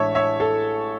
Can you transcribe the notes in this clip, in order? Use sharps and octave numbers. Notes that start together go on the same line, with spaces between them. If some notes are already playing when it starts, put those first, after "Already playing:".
Already playing: A1 A2 G#3 D4 C#5 E5 A5 C#6
C#5 E5
A4